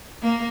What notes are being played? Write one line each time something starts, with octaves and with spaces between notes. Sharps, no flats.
A#3